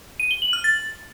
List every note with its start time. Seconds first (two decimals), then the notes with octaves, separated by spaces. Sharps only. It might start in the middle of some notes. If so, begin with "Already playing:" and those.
0.20 D#7
0.31 G7
0.42 F#7
0.53 F6
0.64 A6